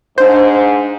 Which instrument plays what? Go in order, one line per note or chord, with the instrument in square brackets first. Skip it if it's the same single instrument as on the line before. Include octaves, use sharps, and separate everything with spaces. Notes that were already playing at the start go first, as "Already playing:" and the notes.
[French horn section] G#2 [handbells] D4 F5 [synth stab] C5